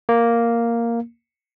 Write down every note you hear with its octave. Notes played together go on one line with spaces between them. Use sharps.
A#3